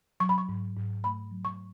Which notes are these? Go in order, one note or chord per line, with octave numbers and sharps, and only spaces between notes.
F#3 C#6
B5
C#6
G#2
G#2
A3 B5
F#3
C#6